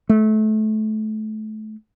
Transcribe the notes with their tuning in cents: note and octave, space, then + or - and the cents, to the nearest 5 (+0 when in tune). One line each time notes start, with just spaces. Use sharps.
A3 -25